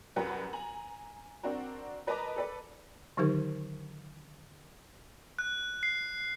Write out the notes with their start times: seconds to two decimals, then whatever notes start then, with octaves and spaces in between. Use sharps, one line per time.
0.16 C2 F#2 F#4 A#4 B4 F#5
0.53 G#5 A#5 F#7
1.43 C4 D4 F#4 A#4
2.07 A#4 B4 D#5 A5 A#5 D6
2.36 A4 B4 D5
3.17 D3 D#3 F#3 D#4 G4 A#4
5.39 F#6
5.83 C7